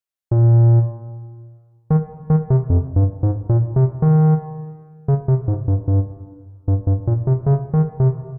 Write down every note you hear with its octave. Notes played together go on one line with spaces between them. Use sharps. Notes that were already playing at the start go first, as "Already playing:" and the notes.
A#2
D#3
D#3
C3
F2
G2
G#2
A#2
C3
D#3
C#3
C3
G#2
G2
G2
G2
G2
A#2
C3
C#3
D#3
C3